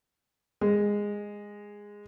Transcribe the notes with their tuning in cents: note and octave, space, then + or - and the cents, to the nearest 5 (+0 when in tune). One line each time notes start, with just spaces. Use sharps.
G#3 -10